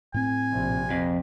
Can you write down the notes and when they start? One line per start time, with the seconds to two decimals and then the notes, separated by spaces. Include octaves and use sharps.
0.14 A2 C4 G#5
0.51 A#1 C3
0.91 F2